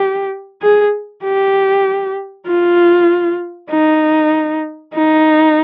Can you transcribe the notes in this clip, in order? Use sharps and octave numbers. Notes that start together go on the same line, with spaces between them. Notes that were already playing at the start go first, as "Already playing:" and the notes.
Already playing: G4
G#4
G4
F4
D#4
D#4